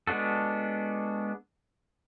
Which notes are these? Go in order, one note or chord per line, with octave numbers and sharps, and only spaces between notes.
G#3 B3 D4 F#4 A4